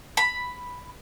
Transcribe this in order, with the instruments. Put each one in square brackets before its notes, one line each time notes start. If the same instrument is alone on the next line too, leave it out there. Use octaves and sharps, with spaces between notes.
[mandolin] B5